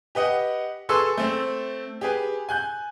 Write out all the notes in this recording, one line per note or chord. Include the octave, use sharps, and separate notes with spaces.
G4 B4 D#5 F#5
G#4 A4 B4 C6 C#6 E6
A3 C4
G4 G#4 B4
G#5 F#6 G6